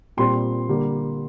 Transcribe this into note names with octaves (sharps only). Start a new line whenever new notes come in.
A#2 G3 C4 C6
D3 G3 A#3